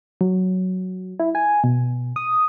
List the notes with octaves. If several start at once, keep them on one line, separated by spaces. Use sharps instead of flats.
F#3
E4
G#5
B2
D#6